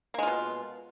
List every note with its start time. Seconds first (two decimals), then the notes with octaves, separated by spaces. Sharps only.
0.14 A#3
0.18 G#3
0.23 F4
0.27 B2